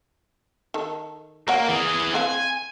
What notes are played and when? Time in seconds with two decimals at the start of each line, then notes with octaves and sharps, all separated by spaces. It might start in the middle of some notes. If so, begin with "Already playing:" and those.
0.74 D#3 A4
1.48 A#3 A#4 C#5 F#5
1.69 E3 G#4
2.14 C4 B4 F5 G#5